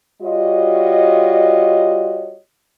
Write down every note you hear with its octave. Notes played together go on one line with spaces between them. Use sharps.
G3 F4 F#4 C#5 D#5